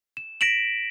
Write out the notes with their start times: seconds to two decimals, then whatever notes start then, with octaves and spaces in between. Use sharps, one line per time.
0.17 E7
0.41 A#6 B6 D7 E7 F#7